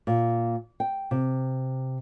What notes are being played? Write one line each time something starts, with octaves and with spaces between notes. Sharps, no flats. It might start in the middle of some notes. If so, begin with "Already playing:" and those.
A#2
G5
C3